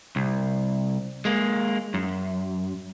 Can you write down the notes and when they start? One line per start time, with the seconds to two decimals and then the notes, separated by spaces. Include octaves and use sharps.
0.16 C2
1.25 G#3 A#3
1.94 F#2